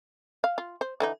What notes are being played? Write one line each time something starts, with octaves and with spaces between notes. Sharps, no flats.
F5
F4
C5
D3 E3 D#4